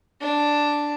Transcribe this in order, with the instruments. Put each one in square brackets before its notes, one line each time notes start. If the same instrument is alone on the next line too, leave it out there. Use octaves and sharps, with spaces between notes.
[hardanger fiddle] D4